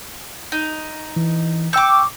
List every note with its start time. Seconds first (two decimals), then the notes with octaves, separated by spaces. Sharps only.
0.52 D#4
1.16 E3
1.73 G5 C#6 D6 E6 G6